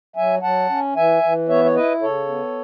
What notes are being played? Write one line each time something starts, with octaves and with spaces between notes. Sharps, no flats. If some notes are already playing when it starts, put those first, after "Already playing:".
F#3 E5 G#5
F#3 F#5 A5
C#4
E3 E5 G#5
E3
B3 C#5 E5
C#5
E4 B4 D#5
C#3 A4 C#5
B3